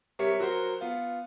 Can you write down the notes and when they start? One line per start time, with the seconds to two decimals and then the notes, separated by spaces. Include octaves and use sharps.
0.19 C3 G3 A#4 C#5 E5 C#7
0.39 F#3 F#4 A#4 C5
0.81 B3 F4